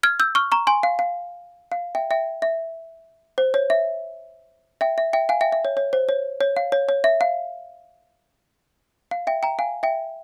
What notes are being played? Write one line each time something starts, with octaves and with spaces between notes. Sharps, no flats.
F6 G#6
E6 G6
C#6 F6
A#5 C#6
G#5 C6
F5
F5
F5
E5 G5
E5 G5
E5
C5
C#5
E5
E5 G5
E5
E5 G5
F5 G#5
E5 G5
E5
C#5
C#5
C5
C#5
C#5
F5
C#5
C#5
E5
F5
F5
E5 G5
G5 A#5
F5 G#5
E5 G5